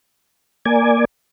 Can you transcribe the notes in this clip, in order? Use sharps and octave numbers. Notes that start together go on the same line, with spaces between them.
A#3 D5 G#5